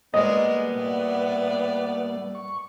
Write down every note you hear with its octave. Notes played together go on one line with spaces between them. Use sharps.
G3 G#3 A#3 B3 A#4 D5 D#5
A2 D5
C#6